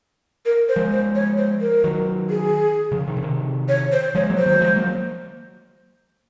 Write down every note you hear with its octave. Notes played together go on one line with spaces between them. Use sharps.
A#4
C5
F3 G#3
C5
C#5
C5
A#4
D#3 F#3
G#4
C#3 F3
C3 D#3
C#3
C3 D#3
C#5
C5
F3 G#3 C#5
F#3 A#3
C5
D#3 F#3
F3 G#3
F#3 A#3